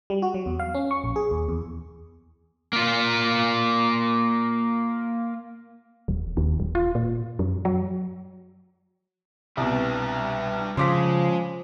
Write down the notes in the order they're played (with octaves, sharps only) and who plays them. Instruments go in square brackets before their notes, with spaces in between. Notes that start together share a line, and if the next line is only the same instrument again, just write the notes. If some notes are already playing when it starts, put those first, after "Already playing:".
[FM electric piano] G3
F#4
F#3
E2
F5
C#4
C#6
A#1
G#4
D#2
E2
[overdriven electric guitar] A#3 F4
[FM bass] D#1
D#2
D#1
F4
A#2
F#2
F#3
[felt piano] C2 B2 [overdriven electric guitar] G3 D4
[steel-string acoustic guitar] C#3 [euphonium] F3 [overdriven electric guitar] G#3 [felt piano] C6 D6 B6